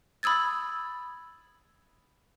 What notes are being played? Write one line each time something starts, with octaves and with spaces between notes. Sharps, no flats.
B5 D#6 E6 G#6 A6